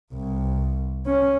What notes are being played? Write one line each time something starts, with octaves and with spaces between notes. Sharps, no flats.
C2
C#4